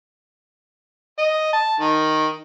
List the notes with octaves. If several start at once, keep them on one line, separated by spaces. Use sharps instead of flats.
D#5
A5
D#3